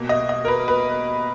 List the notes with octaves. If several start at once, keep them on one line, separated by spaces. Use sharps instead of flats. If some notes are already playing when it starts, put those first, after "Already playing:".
Already playing: B2 A#3
D#5
D#5
A#4
B4
B4